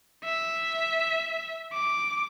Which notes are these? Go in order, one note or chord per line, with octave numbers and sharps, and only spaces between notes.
E5
D6